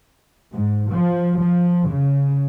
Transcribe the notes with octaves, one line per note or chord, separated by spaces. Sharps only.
G#2
F3
F3
C#3